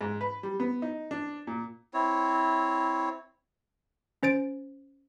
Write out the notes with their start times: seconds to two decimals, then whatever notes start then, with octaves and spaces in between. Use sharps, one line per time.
0.01 G#2
0.21 B4
0.43 G3
0.60 B3
0.82 D#4
1.11 D4
1.47 A#2
1.94 C4 E4 C#5
4.23 C#4 C5 A6 D7